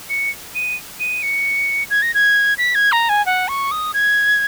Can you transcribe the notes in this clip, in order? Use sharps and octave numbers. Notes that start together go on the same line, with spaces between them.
C#7
D#7
D#7
C#7
G#6
A#6
G#6
B6
G#6
A#5
G#5
F#5
C#6
D#6
G#6